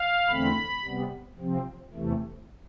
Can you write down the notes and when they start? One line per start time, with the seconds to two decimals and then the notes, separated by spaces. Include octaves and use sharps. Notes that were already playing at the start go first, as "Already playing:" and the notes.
Already playing: F5
0.28 E2 D3 A3 C4 B5
0.84 C3 G3 B3
1.39 C3 F3 C4
1.93 E2 C3 E3 A3